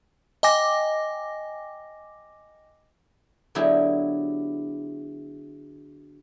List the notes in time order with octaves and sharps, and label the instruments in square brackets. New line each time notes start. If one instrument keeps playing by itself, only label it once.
[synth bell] D#5 G5 G#5 D6 A#6
[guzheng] D3 F#3 B3 E4 G4 G#4